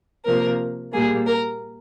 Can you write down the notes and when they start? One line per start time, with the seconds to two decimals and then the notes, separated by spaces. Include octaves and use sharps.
0.25 C3 F3 A#3 A#4
0.93 A#2 G3 A#3 G#4
1.27 A#4